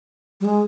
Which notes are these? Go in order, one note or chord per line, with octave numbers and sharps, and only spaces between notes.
G3
G#3